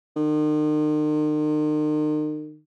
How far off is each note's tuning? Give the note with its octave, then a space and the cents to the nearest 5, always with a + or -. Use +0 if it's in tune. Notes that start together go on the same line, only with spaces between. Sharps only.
D#3 -40